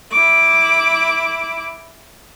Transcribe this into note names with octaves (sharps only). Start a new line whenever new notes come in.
E4 D6